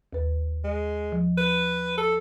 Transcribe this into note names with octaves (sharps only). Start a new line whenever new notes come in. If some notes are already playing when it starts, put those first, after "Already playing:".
D#2 B4
G#3
F3
B4
A4 A5